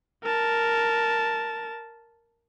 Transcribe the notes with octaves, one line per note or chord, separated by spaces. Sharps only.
A#4 A5